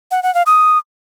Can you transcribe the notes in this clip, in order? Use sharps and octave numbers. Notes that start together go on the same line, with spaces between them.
F#5
F#5
F5
D#6